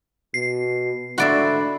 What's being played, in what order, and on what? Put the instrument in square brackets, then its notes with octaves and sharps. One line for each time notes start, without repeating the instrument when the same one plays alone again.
[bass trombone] B2 [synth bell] C7
[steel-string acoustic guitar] G#2 A3 E4 [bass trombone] D3 [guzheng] F#4 D5 E5